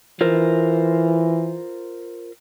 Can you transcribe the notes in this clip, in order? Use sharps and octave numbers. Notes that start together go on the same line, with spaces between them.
E3 F4 A#4 C5